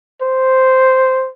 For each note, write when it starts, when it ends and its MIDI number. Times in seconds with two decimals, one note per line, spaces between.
0.22 1.32 72